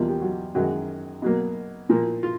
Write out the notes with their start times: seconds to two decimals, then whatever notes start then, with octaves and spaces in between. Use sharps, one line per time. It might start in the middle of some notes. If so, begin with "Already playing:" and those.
Already playing: E2 B2 F3 G3 A#3 F4
0.09 G4
0.21 F#3 F#4
0.55 F#2 D#3 F#3 G#3 F#4
1.22 B2 F#3 A#3
1.89 A#2 F3 A#3
2.23 F4